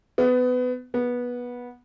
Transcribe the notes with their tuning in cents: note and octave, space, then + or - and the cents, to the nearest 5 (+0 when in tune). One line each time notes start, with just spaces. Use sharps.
B3 +25
B3 -15